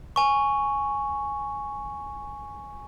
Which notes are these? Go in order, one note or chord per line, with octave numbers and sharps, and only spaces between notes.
G#5 C#6